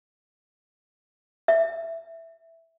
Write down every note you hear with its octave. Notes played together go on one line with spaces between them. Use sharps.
E5